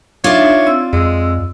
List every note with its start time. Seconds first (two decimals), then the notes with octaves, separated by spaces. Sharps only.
0.24 D4 D#4 F4 C#5 D5 E5
0.67 C4 E6
0.93 F2 G#3